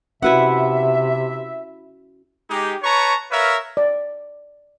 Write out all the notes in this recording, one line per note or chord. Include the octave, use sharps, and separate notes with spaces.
C3 C#4 E4 F#4 B4 E5 F#5
G#3 D#4 G4
B4 C#5 A5 A#5 C#6
A#4 B4 C#5 E5 F5
D5